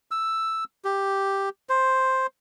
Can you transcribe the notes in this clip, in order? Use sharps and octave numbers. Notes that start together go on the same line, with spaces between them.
E6
G4
C5